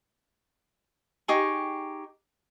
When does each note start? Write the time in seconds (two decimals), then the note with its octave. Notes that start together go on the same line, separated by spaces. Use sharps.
1.28 D#4 G4 G#4 C#6